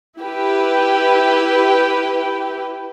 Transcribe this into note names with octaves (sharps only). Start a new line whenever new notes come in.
E4 G4 B4